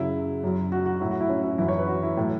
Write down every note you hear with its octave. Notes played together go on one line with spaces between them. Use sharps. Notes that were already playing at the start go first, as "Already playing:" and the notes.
Already playing: F#2 C#3 F#3 E4
F#2 F#3
F#4
F#4
A2 F#3 E4
F#4
E4
C#4
E4
F#2 E3 E4
C#5
B4
F#4
E4
A2 F#3